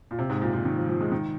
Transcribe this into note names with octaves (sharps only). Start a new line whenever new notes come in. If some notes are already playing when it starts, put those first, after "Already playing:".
A#2
C3
G#2
A#2
A#2
D#3
F3
F3
G#3
D#3